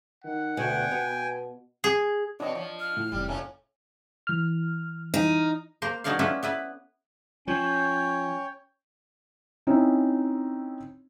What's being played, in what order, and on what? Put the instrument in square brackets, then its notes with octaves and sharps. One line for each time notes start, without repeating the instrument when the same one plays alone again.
[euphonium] D#3 [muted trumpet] F#5
[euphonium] D2 [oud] B2 [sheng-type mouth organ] G5 G#5
[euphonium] B2 [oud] B3
[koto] G#4
[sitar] B2 C4 [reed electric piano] D4 D#5 [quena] C#5
[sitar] F3
[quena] F6
[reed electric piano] A2
[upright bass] F1 C4 [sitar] G3
[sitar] A#2 A3 C#4
[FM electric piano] E3 F6
[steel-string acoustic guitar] D#4
[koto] A#3 A#4 C5
B2 F#3 D#4 C#5 D5 F5
B3 C#4 D4 E4 F4 A4
B3 E4 B4
[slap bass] F3 [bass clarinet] C#4 [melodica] C#5 G5
[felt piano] C4 C#4 D#4 E4